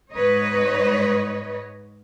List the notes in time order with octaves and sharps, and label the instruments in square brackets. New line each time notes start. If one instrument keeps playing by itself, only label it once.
[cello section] G#2 B4 C#5 D#5